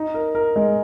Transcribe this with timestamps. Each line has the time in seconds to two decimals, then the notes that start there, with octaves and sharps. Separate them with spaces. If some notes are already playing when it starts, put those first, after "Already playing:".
Already playing: D#4
0.14 A#4
0.35 A#4
0.56 G#3